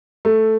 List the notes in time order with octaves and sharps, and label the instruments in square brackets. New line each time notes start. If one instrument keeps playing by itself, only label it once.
[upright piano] A3